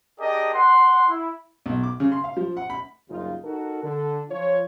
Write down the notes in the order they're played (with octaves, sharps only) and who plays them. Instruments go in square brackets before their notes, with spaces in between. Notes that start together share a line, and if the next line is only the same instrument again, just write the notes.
[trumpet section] D4 G4 G#4 A#4 D5 D#5
F#5 C6
E4
[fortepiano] B1
D6
C#3
C6
F5
F3
F#5
B5
[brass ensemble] F#1 C2 C#3 D#4 F4
D#4 F#4 A4 A#4
D3 A4
F3 F4 C#5